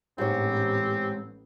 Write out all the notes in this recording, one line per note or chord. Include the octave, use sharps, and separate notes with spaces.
A1 G#2 B3 C4 G4 C#5